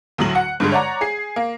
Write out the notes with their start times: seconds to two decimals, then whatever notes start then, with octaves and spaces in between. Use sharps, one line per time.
0.18 D2 A2 F#3 F#7
0.35 F#5
0.60 G2 D3 G#3
0.72 C#5 D5 F#5 A#5
1.01 G#4 C7
1.36 A#3